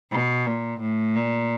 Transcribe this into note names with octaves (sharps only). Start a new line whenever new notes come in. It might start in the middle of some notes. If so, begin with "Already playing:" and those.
B2
A#2
A2
A#2